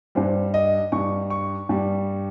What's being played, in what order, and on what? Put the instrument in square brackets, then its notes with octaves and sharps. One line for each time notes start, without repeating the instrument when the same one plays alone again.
[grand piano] G2 G3 C5
D#5
G2 G3 C#6
C#6
G2 G3